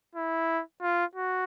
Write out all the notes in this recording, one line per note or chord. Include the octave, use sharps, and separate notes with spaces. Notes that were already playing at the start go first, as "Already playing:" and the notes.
E4
F4
F#4